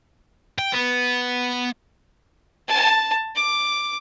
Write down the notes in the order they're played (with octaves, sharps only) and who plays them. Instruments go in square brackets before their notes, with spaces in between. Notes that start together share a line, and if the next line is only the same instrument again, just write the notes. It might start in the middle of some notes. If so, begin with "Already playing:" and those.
[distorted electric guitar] G5
B3
[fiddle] A5
D6